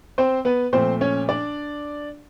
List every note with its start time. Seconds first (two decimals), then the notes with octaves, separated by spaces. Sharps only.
0.18 C4 C5
0.45 B3 B4
0.73 A#2 F3 A3 C4 C5
1.01 C#4 C#5
1.29 D4 D5